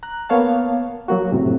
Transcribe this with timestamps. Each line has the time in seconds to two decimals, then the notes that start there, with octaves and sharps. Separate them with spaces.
0.03 A#5 F#6
0.29 A#3 B3 C#5 F5 A5
1.08 F#3 A#3 F#4
1.32 F#2 A2 C3